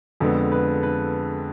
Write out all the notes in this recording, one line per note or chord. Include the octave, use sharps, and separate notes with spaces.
F2 D3 G#3 B3 A4
B4
B4